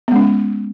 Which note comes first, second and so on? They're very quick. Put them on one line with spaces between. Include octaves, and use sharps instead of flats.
B3 G#3 C#4